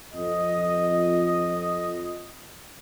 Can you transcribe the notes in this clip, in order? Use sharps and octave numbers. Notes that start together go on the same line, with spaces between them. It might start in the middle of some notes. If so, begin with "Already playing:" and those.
F2 D#5